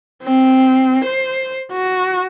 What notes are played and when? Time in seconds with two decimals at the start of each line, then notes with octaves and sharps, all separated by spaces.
0.23 C4
1.04 C5
1.72 F#4